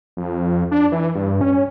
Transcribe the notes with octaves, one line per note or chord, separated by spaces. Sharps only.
F2
D4
E3
G2
C#4